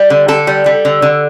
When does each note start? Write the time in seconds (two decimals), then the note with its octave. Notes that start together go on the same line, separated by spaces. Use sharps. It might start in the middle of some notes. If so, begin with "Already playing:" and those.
Already playing: G3
0.10 D3
0.28 D3 A4
0.47 G3
0.66 G3
0.85 D3
1.02 D3